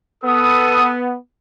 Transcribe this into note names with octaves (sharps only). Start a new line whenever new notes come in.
B3 A4 D#6